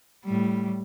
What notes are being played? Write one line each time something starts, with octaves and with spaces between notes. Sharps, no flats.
A2 G3